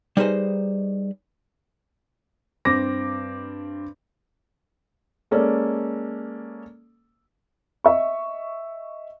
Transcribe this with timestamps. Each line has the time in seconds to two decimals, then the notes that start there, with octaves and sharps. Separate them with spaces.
0.17 G3 D#4 G#4 B4 C5 D#5
2.65 G2 C4 D6 A#6
5.31 G#3 A#3 C#4 A4 D5
7.84 D#5 E5 C#6